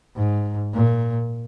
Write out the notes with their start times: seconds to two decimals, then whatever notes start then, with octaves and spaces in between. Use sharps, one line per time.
0.16 G#2
0.73 A#2